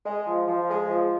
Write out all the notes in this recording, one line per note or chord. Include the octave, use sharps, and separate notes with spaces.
G#3
F3
F3
G#3
F3